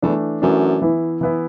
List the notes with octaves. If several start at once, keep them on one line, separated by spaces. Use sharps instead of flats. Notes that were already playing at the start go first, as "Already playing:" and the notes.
E2 E3 A3 D4
F#2 E3 A3 D4
E3 B3 E4
E3 B3 E4